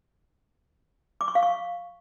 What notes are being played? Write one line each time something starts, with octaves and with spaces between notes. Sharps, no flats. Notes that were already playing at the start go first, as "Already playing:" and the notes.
D6
C#6
F5
C#6